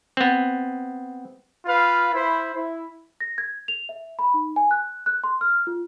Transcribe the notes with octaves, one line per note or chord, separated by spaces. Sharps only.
B3 C4
F4 B4 F5
E4 C5 B5
E4
A#6
G#6
F7
E5
B5
D#4
G#5
F#6
F#6
C6
F6
F4